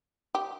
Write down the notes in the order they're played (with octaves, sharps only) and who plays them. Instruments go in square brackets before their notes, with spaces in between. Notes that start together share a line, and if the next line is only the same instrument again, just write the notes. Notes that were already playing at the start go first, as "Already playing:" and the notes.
[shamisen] G4